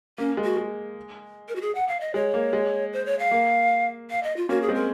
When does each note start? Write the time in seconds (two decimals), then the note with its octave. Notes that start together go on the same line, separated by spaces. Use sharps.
0.18 A#3 C#4
0.37 G#3
0.44 F#4
0.57 G#3
1.49 A#4
1.56 F#4
1.62 G#4
1.75 F#5
1.88 F5
2.01 D#5
2.14 G#3 C#5
2.34 A#3
2.53 G#3
2.93 C5
3.06 C#5
3.19 F5
3.31 A#3
4.10 F5
4.23 D#5
4.37 F4
4.49 A#3 C#4 F#4
4.62 G#4
4.69 G#3 C4
4.75 A#4